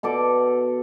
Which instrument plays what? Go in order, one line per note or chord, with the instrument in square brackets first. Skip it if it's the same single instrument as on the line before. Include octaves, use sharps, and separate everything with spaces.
[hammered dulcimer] B2 A4 D5 D6